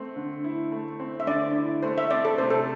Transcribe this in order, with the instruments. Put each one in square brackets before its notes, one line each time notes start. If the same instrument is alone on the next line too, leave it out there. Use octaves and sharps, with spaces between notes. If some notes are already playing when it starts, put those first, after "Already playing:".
Already playing: [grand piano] A3 C4
D3
E4
A3
C4
[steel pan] E5
[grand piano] D3 [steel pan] D5
[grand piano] E4
[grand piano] A3 [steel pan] C5
[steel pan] E5
[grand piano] C4 [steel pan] D5
[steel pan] A4
[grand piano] C3 [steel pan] C5
[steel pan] A4